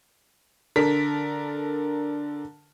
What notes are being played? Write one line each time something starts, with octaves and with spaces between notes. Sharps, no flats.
D3 A4 A#4 B6